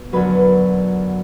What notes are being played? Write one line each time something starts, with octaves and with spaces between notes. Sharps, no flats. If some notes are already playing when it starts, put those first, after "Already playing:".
Already playing: B2
F#2 D3 F#3 B4